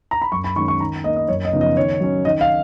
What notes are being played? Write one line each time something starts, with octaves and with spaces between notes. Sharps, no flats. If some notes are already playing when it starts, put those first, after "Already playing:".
A#5
B5
F#2 C#6
B5
D#3 G#3 C#4 C#6
C#6
D#3 A#5
A#3 D#4 D#5
D#5
F#2 C#5
D#5
C#3 F3 B3 D#4
D#5
D#3 C#5
F#3 C#4
D#3 D#5
F5